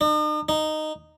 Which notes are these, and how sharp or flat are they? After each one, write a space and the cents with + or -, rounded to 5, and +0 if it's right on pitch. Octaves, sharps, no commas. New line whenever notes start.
D#4 -45
D#4 -10